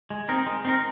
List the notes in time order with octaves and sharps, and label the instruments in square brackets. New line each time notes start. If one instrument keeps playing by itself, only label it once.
[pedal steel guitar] G#3
C4 D#4 A#4
G#3
C4 D#4 A#4